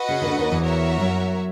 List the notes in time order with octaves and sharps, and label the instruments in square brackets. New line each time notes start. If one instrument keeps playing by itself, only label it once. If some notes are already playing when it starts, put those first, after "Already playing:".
Already playing: [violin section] F#4 B4 D#5 F#5
[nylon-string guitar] C#3
D#3
D2 D3
D#2 D#3
E2 E3
[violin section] F#4 A#4 C#5 E5
[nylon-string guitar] F#2 F#3